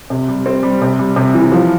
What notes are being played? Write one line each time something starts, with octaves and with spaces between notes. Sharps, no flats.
C3
G3
C4
G3
C3
G3
C3
E3
F3